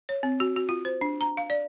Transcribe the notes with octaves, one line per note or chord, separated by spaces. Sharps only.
C#5
C4
F#4
F#4
F4
C5
D4
A#5
F5
D5